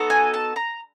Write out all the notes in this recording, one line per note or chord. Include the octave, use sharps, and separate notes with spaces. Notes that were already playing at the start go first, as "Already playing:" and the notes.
Already playing: B3 D#4 F#4 A4
G#5
A5
A#5